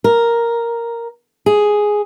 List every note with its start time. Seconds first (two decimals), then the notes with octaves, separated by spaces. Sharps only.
0.04 A#4
1.46 G#4